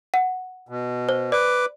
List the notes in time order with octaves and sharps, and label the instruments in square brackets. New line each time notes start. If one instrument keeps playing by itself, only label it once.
[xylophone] F#5
[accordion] B2
[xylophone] C5
[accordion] B4 D6 [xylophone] D5